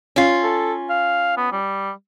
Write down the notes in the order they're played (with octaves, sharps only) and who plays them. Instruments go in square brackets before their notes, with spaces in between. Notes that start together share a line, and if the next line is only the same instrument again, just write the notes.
[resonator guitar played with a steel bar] C#4 F4
[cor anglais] A4
F5
B3
G3